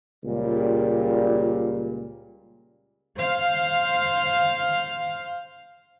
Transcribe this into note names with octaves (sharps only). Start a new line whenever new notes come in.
C#2 A#2 G3
C5 F5